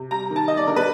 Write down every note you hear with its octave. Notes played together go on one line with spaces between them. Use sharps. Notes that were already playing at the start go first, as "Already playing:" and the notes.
Already playing: C3
G3 A#5
D#3
A5
G3 D#5
D5
D3 A#4
B4